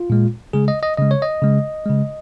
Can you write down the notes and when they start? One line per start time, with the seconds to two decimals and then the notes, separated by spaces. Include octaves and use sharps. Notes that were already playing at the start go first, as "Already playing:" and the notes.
Already playing: F4
0.10 A#2 G#3
0.53 C#3 G#3 G#4
0.68 D#5
0.83 D#5
0.97 C#3 G#3 D#5
1.11 C#5
1.22 D#5
1.42 C#3 G#3
1.86 C#3 G#3